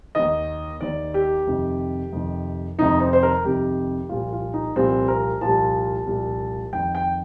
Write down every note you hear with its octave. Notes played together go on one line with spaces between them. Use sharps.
D#2 D#3 D#5
D#2 D#3 D5
G4
F2 C3 D#3
F2 C3 D#3
F2 C3 D#3 D#4
C4
C5
A#4
F2 C3 D#3 G4
C2 A#2 F3 F4
F4
D#4
C2 A#2 F3 C4
A#4
C2 A#2 F3 A5
C2 A#2 F3
F2 D#3 G5
G5